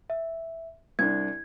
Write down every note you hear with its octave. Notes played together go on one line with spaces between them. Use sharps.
E5
C2 D4 G#6